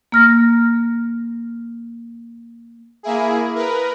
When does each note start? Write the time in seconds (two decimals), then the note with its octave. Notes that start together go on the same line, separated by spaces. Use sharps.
0.12 A#3 F6 A#6
3.03 A#3 E4 G#4
3.55 A#4 B4